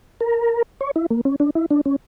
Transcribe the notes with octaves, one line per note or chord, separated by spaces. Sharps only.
A#4
C#5
E4
A#3
C#4
D4
E4
D4
C#4